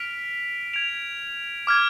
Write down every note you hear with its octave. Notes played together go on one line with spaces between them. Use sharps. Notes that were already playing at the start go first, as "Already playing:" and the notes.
Already playing: F6 B6 D7 F7
G#6 B6 D7 F7
D6 F6 G#6